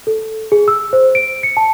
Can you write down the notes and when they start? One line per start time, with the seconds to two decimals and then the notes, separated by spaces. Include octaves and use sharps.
0.07 A4
0.52 G#4
0.68 E6
0.93 C5
1.15 D7
1.43 C#7
1.57 A5